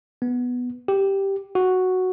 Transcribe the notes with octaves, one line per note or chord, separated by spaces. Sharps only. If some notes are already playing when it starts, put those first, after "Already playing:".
B3
G4
F#4